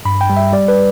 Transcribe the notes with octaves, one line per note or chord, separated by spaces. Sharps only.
G2 B5
G5
G3
E5
G3 D5
B4